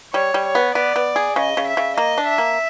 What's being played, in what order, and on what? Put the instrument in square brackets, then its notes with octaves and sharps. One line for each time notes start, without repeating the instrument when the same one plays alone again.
[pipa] G3 [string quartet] C#5
[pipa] G3
[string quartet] C#5
[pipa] B3
[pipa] B3 [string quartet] D5
[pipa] B3
G#4
[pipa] C#3 [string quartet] D#5
[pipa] C#3
[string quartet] E5
[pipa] C#3
[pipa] A#3 [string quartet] D#5
[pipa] D4
[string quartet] E5
[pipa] A#3